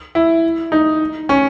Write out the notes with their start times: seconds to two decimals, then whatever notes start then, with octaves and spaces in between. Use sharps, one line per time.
0.15 E4
0.72 D#4
1.29 C#4